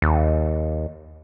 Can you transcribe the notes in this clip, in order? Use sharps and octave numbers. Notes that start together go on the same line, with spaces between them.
D#2